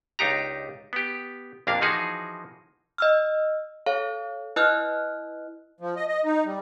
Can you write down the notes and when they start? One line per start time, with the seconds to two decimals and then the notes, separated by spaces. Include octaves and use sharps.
0.19 C#2 D4 D#4 G4 A#5
0.93 B3 G4
1.67 A#1 F2 A#3 D4 F5
1.81 E3 F3 D#4 F#4 G#4
2.98 D#5 E6 F6
3.86 A4 C#5 F5
4.56 E4 B4 D#5 F6 F#6
5.81 F3
5.97 D#5
6.08 D#5
6.25 D#4
6.45 G3